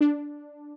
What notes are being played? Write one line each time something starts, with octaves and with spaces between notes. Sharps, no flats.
D4